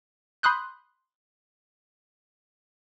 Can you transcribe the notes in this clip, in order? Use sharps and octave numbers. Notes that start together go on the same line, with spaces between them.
B5 C6 D#6 F#6 G6